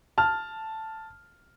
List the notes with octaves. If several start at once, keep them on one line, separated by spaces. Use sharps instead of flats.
A5 F6